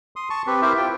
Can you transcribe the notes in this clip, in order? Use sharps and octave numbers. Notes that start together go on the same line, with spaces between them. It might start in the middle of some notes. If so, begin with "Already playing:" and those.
C6 D#6
A5 C#6
C4 G4 B4
E4 G4 A#4 C5 E5
F4 G5